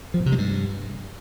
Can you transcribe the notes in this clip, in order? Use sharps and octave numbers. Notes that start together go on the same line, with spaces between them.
F3
A#2
C3
G#3
G2